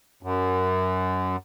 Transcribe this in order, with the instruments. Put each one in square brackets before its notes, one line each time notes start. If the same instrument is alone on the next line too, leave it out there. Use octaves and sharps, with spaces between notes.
[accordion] F#2